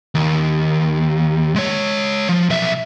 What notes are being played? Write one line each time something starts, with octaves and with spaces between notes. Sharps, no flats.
D#2
G#3 C#5
F3
B1 E5